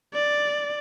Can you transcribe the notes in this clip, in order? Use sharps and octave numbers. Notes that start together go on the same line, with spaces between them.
D5